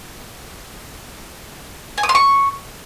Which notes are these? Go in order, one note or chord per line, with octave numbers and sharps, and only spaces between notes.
G#5
D#6
C6
C#6